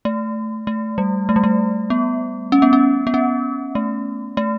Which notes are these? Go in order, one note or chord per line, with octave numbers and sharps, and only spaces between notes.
A3
A3
G3
A3
G3
A3
B3
C#4
B3
C#4
B3
C#4
A3
A3